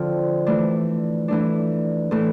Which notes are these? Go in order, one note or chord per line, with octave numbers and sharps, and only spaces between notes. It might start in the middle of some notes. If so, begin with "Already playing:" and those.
Already playing: D3 F3 C4 F4
E3 A3 D4
E3 A3 D4
A2 E3 A3